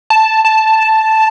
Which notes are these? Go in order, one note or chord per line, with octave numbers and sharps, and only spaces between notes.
A5
A5